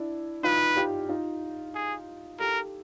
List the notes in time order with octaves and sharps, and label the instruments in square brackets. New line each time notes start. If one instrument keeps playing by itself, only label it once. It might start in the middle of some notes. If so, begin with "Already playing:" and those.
Already playing: [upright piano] D4 E4
[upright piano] D#4 F4 [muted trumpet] B4
[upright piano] F4 G4
D#4 F4
[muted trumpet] G#4
[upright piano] G4 A4 [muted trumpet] A#4